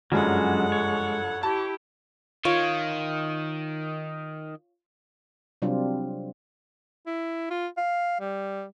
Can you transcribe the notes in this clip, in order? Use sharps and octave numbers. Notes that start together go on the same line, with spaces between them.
F#1 G2 F3 F#3 G#3 C#4 A4 F#5
C#5
E4 G4 A5
D#3 F4 C#5 F5
C3 F#3 G3 C4 D4 F4
E4
F4
F5
G3